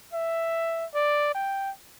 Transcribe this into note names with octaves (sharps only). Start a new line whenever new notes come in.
E5
D5
G5